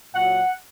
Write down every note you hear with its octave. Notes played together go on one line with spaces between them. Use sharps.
A#2 F#3 F#5